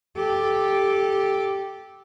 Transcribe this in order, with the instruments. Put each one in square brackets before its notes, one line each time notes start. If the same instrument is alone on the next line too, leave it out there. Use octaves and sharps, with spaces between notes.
[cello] G4 A4